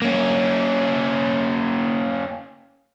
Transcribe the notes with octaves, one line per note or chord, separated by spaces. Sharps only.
A#3 C#4